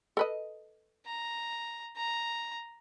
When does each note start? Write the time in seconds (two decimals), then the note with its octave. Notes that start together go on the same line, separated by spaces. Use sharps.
0.17 A4 B4 D#5
1.06 A#5
1.96 A#5